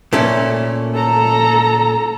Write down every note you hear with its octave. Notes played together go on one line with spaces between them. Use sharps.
A#2 A3 C#4
A4 A#5